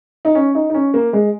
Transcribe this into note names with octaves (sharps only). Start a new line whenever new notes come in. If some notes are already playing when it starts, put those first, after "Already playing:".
D#4
C#4
D#4
D#4
C#4
A#3
G#3